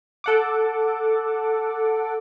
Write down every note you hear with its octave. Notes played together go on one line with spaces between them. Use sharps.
A4 F#5 D6